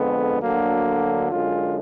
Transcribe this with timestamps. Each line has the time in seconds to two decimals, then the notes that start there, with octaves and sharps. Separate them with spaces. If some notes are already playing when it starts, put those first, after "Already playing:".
Already playing: F2 D3 G#3 B3
0.41 D2 D3 F#3 A#3
1.31 F#2 D3 G#3 F4